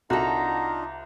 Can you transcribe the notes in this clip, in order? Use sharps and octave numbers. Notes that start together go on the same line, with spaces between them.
C2 D4 D#4 F4 F#4 A4 A#5